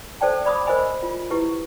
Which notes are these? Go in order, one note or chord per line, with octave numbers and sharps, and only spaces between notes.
A4 C5 D5 G5 A5
D5 B5 D6 D#6
A#4 C5 D#5 G#5 B5
F4
E4 G4 B4